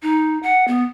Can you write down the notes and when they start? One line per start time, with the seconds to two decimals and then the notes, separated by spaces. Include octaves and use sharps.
0.02 D#4
0.43 F#5
0.68 B3